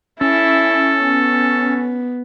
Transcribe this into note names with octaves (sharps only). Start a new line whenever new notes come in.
C#4 E4 A4
B3